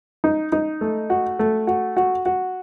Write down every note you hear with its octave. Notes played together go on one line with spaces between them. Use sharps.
D#4
D#4
A3
F#4
A3
F#4
F#4
F#4